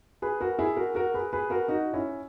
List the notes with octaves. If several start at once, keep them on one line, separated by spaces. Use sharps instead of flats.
G#4 B4
F#4 A#4
E4 G#4
F#4 A#4
F#4 A#4
G#4 B4
G#4 B4
F#4 A#4
D#4 F#4
C#4 E4